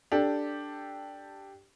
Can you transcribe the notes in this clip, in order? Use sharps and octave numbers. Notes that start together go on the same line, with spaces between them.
D4 G4 A4